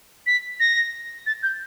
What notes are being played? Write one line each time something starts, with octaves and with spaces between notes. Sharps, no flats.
B6
A#6
A6
G6